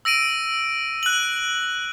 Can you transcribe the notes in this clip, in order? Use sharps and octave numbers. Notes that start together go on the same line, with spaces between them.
E6 A#6 D7 D#7
F#6 F#7